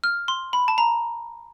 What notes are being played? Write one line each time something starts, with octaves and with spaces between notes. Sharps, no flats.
F6
C6
B5
A5
A#5